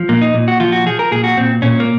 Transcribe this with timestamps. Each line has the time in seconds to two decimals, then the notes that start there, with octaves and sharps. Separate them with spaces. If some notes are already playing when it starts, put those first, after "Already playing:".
Already playing: F3
0.09 A#2 A#3
0.21 D#4
0.35 A#2
0.48 F#4
0.60 F3 F4
0.72 F#4
0.86 F3 G#4
0.99 A#4
1.12 A#2 G#4
1.24 F#4
1.37 A#2 C4
1.62 A#2 C#4
1.80 A#3